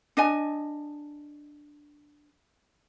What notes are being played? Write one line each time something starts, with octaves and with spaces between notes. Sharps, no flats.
D4 D#5 G#5